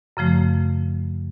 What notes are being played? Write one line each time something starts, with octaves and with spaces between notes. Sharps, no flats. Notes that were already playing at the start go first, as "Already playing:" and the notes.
F#2 C#3 F3 A3